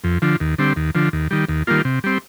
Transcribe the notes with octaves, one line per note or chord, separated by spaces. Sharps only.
F2
D3 F3
D#2
D3 G3 C4
D#2
D3 F3
D#2
D#3 G3
D#2
D#3 G3 A#3 F4
C3
G3 C4